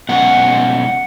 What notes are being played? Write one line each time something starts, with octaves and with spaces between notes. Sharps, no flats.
B2 G#3 C#4 F#5